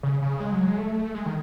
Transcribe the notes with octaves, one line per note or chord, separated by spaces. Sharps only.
C#3
C#3
G#3
F#3
G#3
A3
G#3
D#3